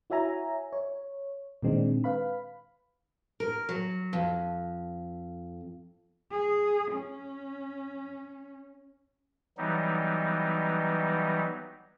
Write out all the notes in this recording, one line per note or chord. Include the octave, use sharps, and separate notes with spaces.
E4 F#4 C#5 E5 G#5 A#5
C#5
A#2 D#3 G#3 C4 D4
B4 F5 B5
A#4
F#3
F2
G#4
C#4
E3 F#3 G3 B3 D#4